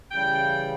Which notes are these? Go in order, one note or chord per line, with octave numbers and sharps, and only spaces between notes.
C#3 E3 G3 G5